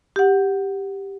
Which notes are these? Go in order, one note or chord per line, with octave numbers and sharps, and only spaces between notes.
G4 F#5